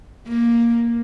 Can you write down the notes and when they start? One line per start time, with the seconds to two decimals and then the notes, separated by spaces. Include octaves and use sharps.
0.28 A#3